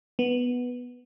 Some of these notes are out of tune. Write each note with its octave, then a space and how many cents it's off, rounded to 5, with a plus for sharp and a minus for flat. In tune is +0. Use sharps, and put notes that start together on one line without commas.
B3 -5